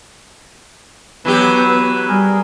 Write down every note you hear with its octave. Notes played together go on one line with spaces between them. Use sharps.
E3 F#3 B3 G4 B4
G3 G#4 A#4